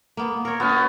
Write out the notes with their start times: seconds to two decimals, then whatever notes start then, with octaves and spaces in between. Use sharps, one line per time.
0.17 A#3 B3
0.45 A#4 C#5
0.60 B3 C#4 F#4